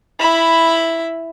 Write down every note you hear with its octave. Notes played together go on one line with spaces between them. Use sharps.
E4 B5